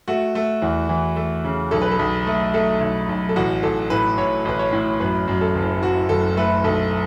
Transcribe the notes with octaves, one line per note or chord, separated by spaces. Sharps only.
A3 F#4
A3
E2
E3
A3
C#3
B1 A4
B4
A4
B1
A3
A3 A4
B1
B1
A4
A1 F#4
A1 A4
A2 B4
A2 C#5
A1 B4
C#5
A2
F#2 B4
F#2
A4
F#1
F#3 F#4
F#1 A4
A3 B4
B1 A4